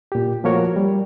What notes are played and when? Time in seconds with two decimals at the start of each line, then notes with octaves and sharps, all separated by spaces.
0.12 A#2 G4
0.44 F3 A3 A#3 F#4 A#4 C#5
0.76 G3